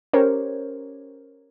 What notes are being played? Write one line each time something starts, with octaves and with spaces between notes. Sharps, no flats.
C#4 G4 A#4 C5 C#5